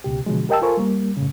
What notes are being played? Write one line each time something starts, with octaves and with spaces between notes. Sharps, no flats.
C#2 B2 G4
B2 D3 F3 F#3 G#3
G4 A#4 D#5 G5 A5 E6
F4 A4 A#4 C5 G#5 C#6
G3 A#3
F#2 A2 C#3